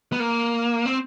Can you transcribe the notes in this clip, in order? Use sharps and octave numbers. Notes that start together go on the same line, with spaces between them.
B3
A#3
C4